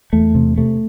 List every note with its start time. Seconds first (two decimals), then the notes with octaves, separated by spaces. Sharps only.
0.13 E2 A3
0.35 C3
0.58 C3 A3